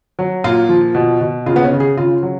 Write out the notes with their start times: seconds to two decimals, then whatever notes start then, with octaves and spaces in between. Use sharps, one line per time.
0.19 F#3
0.44 A#2 F4
0.69 F3
0.95 B2
1.21 B2
1.46 C#3 F4
1.56 B3
1.64 C#4
1.72 C#3
1.80 G#4
1.97 C#3 F4
2.23 F#3